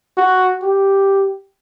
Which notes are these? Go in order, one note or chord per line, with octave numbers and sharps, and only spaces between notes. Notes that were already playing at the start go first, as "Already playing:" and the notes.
F#4
G4